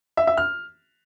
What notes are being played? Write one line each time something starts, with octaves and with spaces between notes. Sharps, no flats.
E5
E5
F6